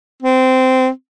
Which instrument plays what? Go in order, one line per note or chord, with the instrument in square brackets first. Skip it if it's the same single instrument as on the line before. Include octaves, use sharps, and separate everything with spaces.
[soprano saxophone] C4